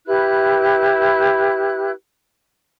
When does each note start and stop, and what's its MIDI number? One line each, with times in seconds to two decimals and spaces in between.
0.06 1.90 64
0.06 1.90 67
0.06 1.90 71
0.06 1.90 90